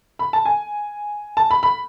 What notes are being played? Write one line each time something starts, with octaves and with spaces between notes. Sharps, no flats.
B5
A5
G#5
A5
B5
B5